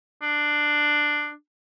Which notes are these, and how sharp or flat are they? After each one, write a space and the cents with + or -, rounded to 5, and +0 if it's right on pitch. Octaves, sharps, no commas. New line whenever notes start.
D4 +10